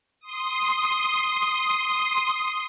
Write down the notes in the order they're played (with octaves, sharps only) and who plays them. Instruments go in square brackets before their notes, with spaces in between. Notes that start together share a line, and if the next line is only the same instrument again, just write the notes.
[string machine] C6 D#6